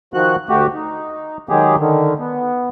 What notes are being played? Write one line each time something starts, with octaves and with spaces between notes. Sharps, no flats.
D#3 F3 F#4 F#6
D2 A3 F#4 G4
D#4
D#3 F#3 G#3 G4 G#4
D3 D#3
B3